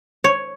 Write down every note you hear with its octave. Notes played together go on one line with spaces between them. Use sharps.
C#5